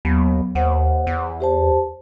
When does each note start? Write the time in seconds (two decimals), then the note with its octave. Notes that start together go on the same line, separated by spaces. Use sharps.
0.05 D#2 F#3 B3
0.55 D#2 C5 F#5
1.07 E2
1.40 G4 C5 A5